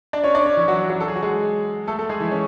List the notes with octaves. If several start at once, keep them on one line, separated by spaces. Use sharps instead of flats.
D4 D5
C#4 C#5
D4 D5
C#4 C#5
E3 E4
F#3 F#4
F#3 F#4
A4
G#4
F#4
G#3 G#4
A3 A4
A3 A4
G#3 G#4
E3 E4
C#4